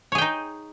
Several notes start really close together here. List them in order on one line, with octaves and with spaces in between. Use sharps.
C#5 G#4 G5 D#4